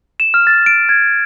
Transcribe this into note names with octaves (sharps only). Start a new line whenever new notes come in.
E7
F6
A6
D7
G#6